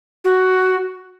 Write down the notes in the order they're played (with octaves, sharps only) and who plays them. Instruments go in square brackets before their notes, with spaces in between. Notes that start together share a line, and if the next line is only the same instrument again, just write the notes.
[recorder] F#4